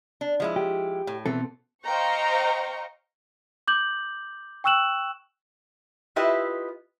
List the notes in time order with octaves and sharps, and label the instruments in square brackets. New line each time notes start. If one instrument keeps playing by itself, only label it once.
[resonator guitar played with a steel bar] D4
F3 G#3 E4
[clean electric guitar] G4
[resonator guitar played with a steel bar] A2
[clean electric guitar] B2 C4 A4 [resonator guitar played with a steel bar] E3
[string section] C5 D#5 F5 G5 A#5 C#6
[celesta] D6 G6 F#7
G5 C#6 E6 F#6 E7 F#7
[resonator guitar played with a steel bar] E4 F4 G4 B4 D#5 E5